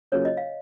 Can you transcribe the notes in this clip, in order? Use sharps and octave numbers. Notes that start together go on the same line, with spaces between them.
C#3 F#3 A#3 F4 G#4 C#5
D#5
F5